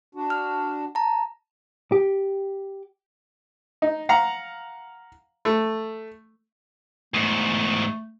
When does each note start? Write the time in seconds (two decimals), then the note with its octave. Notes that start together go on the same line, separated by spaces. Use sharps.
0.15 D4 F#4
0.30 F6
0.95 A5 A#5
1.92 G4
3.82 D#4
4.09 F5 F#5 A#5
5.45 A3
7.14 E2 G#2 A3